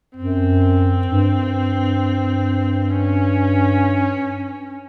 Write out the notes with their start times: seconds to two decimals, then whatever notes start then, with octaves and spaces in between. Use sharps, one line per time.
0.16 F#2 C4
1.07 G2
2.90 C#4